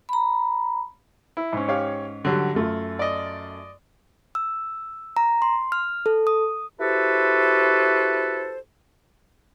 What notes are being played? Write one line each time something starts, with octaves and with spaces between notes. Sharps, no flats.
A#5 B5
E4
G#2 C#4
G4 C#5 F5
D3 F#3 G3
F#2 A3 F4
D5 D#5
E6
A#5
C6
F6
A4
D#6
E4 F#4 G4 A4 B4 C5